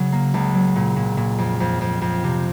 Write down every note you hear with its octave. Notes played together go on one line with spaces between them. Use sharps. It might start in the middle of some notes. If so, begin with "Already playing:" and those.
Already playing: C#3 F#3
A#3
C#2
F#3
A#2
A#2
A#2
F2
F2
F2
F2
C3